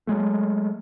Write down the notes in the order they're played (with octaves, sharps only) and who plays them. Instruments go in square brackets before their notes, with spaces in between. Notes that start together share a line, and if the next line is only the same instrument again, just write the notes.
[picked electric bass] F#3 G#3 A3